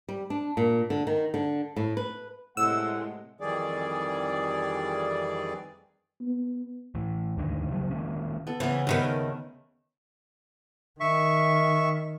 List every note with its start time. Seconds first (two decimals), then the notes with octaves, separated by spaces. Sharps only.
0.09 G3
0.30 D4
0.57 A#2
0.90 D3
1.07 D#3
1.34 D3
1.76 A2
1.97 B4
2.57 A2 C3 G#3 A3 F#5 E6
3.41 F2 D#3 E3 G3 G#4 D5
6.21 B3
6.95 A2 E3
7.37 D#2 G#2 D3 D#3
7.70 C#3 F#3 G3
7.91 D#3 G#3 A#3 C#4
8.47 B3 A4
8.60 C#3 E3 B3
8.87 D#2 D#3 A3 B3 A#4 E5
11.00 D#3 E5 C#6